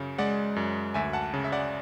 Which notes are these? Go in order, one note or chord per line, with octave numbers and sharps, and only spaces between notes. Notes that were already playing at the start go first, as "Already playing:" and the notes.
Already playing: F#2 C#3
G#3 D5 F#5
F#2
D2 E5 G#5
F#5 A5
C#3
E5
D5 F#5